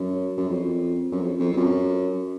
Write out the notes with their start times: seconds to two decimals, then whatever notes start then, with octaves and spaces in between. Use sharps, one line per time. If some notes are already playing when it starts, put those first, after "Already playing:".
Already playing: F#2
0.37 F#2
0.49 F2
1.12 F#2
1.20 F2
1.39 F2
1.52 F2
1.57 F#2